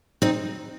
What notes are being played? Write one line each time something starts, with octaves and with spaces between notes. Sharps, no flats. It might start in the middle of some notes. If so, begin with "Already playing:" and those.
C4 D#4